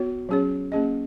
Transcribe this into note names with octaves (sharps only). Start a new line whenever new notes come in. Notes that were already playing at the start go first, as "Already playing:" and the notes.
Already playing: B3 F#4 C#5
F#3 C#4 G#4 C#5
A#3 C#4 G#4 D#5